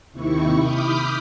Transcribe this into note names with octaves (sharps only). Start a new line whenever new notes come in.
D#2 C3 D#3 E4 C#6
B5 D6 D#6 F6 G6